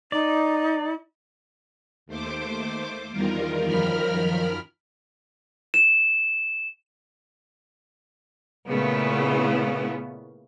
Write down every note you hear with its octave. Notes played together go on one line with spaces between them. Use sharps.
D#4 D5
D#2 A3 C5 D6
E2 D#3 G3 F4 A#4
F#2 D#3 F3 A#4 B5 F6
E7
A#2 C#3 A3 B3 C#4 E4